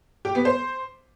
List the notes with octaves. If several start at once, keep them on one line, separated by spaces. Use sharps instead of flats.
G4
B3
C5